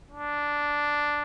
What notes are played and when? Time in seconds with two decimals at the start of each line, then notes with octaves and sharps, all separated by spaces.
0.11 D4